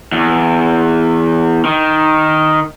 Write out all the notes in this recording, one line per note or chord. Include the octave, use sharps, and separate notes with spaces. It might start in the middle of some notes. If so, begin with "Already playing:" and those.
E2
D#3